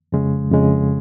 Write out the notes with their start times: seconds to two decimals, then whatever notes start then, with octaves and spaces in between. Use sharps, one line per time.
0.12 F2 C#3 G#3
0.51 F2 C#3 G#3